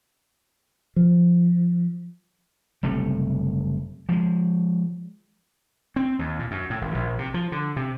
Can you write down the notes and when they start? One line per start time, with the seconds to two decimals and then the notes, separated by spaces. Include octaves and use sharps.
0.96 F3
2.83 F#1 C3 G3 A3
4.09 F3 G#3
5.96 C4
6.19 D#2
6.39 A#2
6.51 F#2
6.70 A2
6.81 G#1
6.94 A#1
7.18 C3
7.34 F3
7.52 D3
7.76 C3